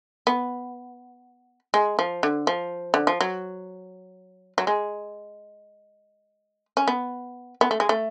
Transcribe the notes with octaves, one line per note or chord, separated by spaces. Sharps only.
B3
G#3
F3
D3
F3
D3
F3
F#3
F#3
G#3
C#4
B3
B3
A3
G#3
A3